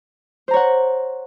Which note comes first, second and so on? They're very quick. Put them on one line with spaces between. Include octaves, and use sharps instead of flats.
C5 A#5 C#5 F#5